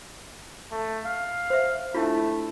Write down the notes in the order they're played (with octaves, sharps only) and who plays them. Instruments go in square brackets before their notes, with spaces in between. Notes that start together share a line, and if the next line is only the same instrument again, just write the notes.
[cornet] A3
F5
[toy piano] C5 E5
[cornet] A3 [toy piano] D4 E4 F4